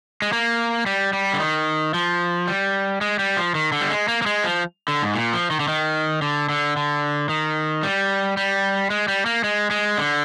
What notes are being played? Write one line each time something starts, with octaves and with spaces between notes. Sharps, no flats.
G#3
A#3
G3
G3
D3
D#3
F3
G3
G#3
G3
F3
D#3
D3
G3
G#3
A#3
A#3
G#3
F3
D3
G#2
A#2
F3
D#3
D3
D#3
D3
D3
D3
D#3
G3
G3
G#3
G3
A#3
G#3
G#3
D3